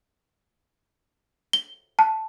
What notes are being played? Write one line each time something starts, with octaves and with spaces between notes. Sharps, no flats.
G7
A5